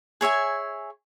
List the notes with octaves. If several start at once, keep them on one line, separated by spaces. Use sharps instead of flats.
G#4 C#5 E5 G#5